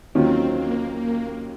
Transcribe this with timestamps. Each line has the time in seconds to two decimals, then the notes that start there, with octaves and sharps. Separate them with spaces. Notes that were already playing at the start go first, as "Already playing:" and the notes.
0.15 D#2 D#3 F#3 C4 C#4 F4
0.56 A#3
0.95 A#3